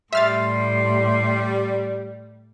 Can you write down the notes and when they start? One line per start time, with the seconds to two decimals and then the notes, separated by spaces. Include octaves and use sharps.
0.13 A2 G3 E5 C6 F6 A6